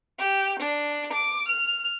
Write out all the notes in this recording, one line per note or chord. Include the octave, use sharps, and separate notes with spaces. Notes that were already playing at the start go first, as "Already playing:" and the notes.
G4
D4
D6
F6